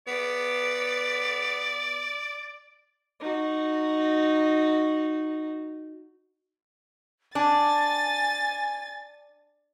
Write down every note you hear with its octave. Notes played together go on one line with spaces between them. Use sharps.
B3 D5
D#4 F#4
D4 G#5 A6